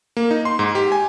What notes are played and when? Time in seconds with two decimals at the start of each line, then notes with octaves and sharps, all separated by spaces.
0.17 A#3
0.31 D#4
0.45 C6
0.59 G#2
0.75 G4
0.92 G#5